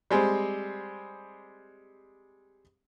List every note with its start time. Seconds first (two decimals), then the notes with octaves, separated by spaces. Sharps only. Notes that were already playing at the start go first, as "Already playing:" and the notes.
0.10 G3 G#3 C4